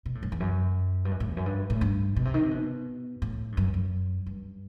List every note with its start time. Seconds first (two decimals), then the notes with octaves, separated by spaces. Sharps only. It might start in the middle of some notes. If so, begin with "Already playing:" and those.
0.06 B2
0.15 A2
0.23 F#2
0.32 E2
0.40 F#2
1.05 G2
1.11 F#2
1.20 A2
1.29 E2
1.37 F#2
1.46 G2
1.70 A2
1.81 G2
2.16 B2
2.25 C3
2.34 D#3
2.43 C3
2.51 B2
3.22 A2
3.52 G2
3.57 F#2
3.74 F#2
4.26 G2